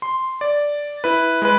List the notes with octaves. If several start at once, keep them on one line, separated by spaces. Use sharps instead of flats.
C6
D5
E4 B4
G#3 B4